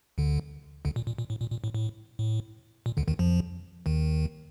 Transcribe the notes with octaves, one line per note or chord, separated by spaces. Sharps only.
D2 D3
D2 D3
A#2
A#2
A#2
A2
A#2
A#2
A2
A2
A2
A#2
D2 D3
D#2 D#3
F2 F3
D#2 D#3